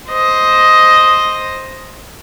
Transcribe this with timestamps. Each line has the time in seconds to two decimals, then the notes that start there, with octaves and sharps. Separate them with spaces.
0.10 C5 D#5